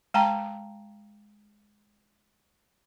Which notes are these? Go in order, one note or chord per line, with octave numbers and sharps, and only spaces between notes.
G#3 G5 A5 A#5